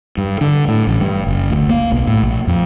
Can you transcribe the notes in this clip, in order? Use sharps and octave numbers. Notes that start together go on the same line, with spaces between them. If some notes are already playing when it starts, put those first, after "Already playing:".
G2
D3
A2
A1
G2
F#1
D2
A#3
B1
A2
A#1
F2